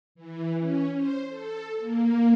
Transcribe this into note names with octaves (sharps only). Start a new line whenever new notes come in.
E3
C#4
C5
A4
A#3